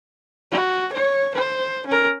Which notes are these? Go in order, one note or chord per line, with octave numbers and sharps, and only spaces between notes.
F#4
C#5
C5
C#4 A#4